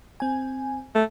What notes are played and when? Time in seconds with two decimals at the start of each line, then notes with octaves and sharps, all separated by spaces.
0.20 C4 G#5
0.95 A3